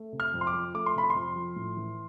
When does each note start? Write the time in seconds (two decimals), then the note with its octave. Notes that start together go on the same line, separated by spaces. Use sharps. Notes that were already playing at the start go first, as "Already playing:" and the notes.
Already playing: A3
0.13 C3
0.20 F6
0.33 F2
0.41 C6
0.47 D6
0.54 F3
0.74 A3 D6
0.86 C6
0.95 C3 B5
1.10 F2 C6
1.36 F3
1.56 A2
1.77 E3